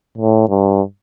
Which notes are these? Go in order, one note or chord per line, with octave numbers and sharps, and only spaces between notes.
A2
G2